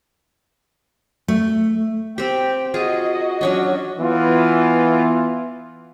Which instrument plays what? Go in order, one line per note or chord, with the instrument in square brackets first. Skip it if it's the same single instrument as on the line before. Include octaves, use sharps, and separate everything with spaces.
[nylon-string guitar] A3
[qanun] C4 G4 [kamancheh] G5
[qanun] F4 G#4 [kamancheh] F#4 D#5
[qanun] F#3 C#4 D4
[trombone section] E3 B3 F4